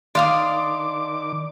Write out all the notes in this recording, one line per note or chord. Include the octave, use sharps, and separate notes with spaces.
D#3 D4 D5 F5 C6 D6 D#6